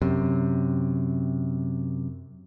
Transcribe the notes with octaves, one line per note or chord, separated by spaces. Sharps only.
F#2 C3